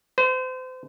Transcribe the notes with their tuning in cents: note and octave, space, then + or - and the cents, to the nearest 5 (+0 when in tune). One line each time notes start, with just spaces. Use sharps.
C5 -35